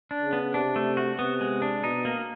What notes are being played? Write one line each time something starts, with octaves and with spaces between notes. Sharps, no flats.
D4
C#3
B3
C3 D4
A3
F#4
C3 B3
G#3
D4
B2 D#4
A#3